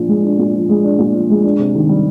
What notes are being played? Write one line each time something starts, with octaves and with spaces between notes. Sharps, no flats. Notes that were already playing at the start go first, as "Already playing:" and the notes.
Already playing: A#2 F3 D4
G#3
D4
A#2
F3
G#3
D4
A#2
F3
G#3
D4
C3
D#3
G3